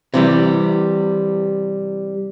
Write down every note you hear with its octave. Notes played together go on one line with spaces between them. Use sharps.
C3 E3 G3